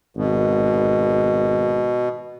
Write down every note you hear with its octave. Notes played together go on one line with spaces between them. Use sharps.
G#1 B2